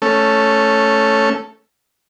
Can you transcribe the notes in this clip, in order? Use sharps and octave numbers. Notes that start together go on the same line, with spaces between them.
A3 C#4 A4